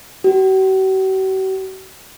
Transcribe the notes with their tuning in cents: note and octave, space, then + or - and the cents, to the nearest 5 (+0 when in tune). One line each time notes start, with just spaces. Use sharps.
F#4 +45